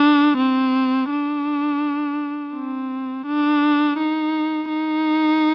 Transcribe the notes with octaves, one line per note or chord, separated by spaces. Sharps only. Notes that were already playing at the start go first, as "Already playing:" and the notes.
Already playing: D4
C4
D4
C4
D4
D#4
D#4